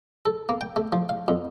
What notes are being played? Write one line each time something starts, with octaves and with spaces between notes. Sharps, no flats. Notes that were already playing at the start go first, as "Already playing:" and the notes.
A4
A#3
G5
A3
F3
F5
F2